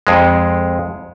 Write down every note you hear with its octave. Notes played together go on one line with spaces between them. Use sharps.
F2 G#3